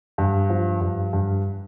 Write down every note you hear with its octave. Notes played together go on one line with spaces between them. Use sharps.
G2
F3
G2
G2